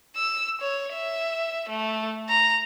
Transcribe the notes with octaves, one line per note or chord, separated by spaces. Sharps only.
E6
C#5
E5
A3
A#5